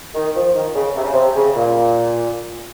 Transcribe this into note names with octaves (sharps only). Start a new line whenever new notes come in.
D#3
F3
D#3
C#3
C3
C#3
C3
C#3
A#2